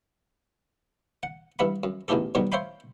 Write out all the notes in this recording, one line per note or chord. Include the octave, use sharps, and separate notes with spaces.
F#5
G2 E3 E5 F#5 B5
F#2
A1 E2 D#3 E3 G4 A4
G#2 B2 D#3 F#3 G3
C5 C#5 E5 F5 G5 B5